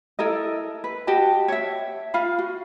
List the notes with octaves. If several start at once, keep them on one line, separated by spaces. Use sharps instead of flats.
E4 A4 A#4 D#5
B4
F#4 G4 D#5 A5
C#5 E5
F4 F5 B5
F#4